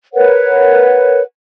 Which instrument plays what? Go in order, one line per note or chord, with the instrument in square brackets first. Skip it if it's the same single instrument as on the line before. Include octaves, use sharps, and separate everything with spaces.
[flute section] A#4 B4 C#5 F#5